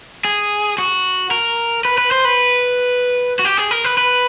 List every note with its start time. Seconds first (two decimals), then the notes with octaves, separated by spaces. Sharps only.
0.25 G#4
0.78 F#4
1.31 A#4
1.85 B4
1.98 B4
2.11 C5
2.25 B4
3.39 F#4
3.45 G4
3.57 G#4
3.71 A#4
3.84 B4
3.98 B4